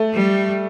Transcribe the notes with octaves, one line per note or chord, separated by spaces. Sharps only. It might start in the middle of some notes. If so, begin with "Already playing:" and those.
Already playing: A3
G3